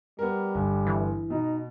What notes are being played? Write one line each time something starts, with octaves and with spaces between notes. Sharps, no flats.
G3 B3 A#4
G1
E3
B2 D#4